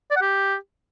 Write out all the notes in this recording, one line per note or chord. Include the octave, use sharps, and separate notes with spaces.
D5
F#5
G4